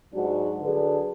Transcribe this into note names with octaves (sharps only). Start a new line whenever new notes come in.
G#2 F#3 D4 F#4
D3 F#3 D4 G#4 B4